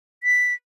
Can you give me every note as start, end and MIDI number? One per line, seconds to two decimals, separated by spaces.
0.23 0.54 95